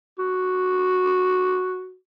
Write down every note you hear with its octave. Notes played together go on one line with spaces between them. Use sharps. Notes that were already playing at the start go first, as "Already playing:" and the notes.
F#4